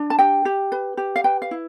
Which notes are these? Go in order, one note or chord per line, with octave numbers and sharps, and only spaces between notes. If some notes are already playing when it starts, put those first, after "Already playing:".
Already playing: D4
A5
G4 G5
G4
B4
G4
F5
B4 G5
F5
E4